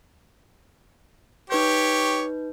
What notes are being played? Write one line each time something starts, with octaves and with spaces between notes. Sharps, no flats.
D#4 G4 B4 C#5 G6